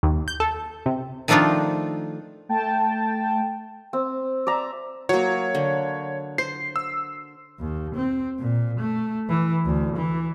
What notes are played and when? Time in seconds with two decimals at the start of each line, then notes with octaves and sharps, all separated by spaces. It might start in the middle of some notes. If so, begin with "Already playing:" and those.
0.03 D#2
0.28 G6
0.40 A4
0.86 C3
1.28 D#3 F3 A3 D4 D#4 F4
2.49 A3 G5 A5
3.93 C4
4.47 D5 E5 A#5
5.09 F#3 A#3 C#5
5.55 D3
6.38 C5 C7
6.76 E6
7.60 D#2
7.95 C4
8.39 A#2
8.80 A3
9.29 E3
9.65 D2
9.97 E3